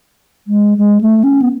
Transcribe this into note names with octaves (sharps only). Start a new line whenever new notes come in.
G#3
G#3
A3
C#4
B3